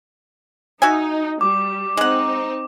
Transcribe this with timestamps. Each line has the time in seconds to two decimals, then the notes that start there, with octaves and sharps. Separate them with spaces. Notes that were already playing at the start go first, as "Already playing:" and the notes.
0.82 D#4 F#4 E5 G#5
1.41 G3 D6
1.97 G#3 C4 D#4 F#5